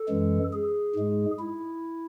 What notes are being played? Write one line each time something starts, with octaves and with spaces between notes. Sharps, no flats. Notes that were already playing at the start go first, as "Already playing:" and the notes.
Already playing: A4
F#2 E3 G#3
G#4
G#2 G#3
E4